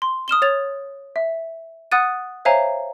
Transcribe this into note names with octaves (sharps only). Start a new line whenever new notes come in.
C6
D#6 F6 E7 G7
C#5 A6 F7
E5
F#5 D#6 F#6 A6 D#7
C5 C#5 E5 F5 G#5 A#5